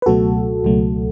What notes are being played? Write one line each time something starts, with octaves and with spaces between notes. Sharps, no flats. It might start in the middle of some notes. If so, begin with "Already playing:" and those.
B4
C#2 B2 F#3 A3 F#4 A4
C#2 B2 F#3 A3